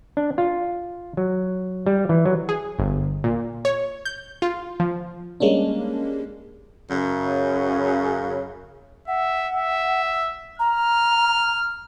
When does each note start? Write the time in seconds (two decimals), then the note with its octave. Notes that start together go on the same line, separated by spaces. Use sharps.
0.17 D4
0.38 F4
1.17 F#3
1.86 G3
2.09 E3
2.25 F#3
2.49 G#4
2.79 G1
3.24 A#2
3.65 C#5
4.05 G6
4.42 F4
4.80 F3
5.40 G3 G#3 A#3 C#4 D4
6.90 F#2 C#3
9.08 E5 F#5
9.55 E5
10.59 A#5 F6